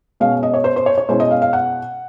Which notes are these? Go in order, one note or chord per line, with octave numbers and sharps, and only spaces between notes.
B2 G#3 C#4 F5
D#5
C#5
C5
C5
C#5
C#5
B2 G#3 C#4 E4 C5
D#5
F5
F5
F#5